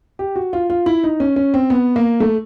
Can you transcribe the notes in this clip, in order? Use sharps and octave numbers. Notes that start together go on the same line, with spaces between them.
G4
F#4
F4
F4
E4
D#4
C#4
C#4
C4
B3
A#3
A3